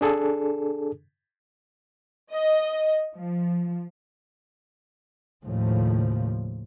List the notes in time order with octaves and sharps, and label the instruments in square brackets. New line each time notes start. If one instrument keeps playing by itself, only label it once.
[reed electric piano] D4 G#4 A4
[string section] D#5
F3
[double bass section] D#2 A2 C#3 F3